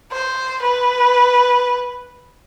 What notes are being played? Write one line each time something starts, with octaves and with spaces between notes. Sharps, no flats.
C5
B4